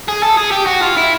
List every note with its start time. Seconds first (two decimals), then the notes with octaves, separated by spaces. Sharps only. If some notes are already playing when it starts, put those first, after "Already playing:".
0.08 G#4
0.23 A4
0.37 G#4
0.52 G4
0.67 F#4
0.83 F4
0.97 E4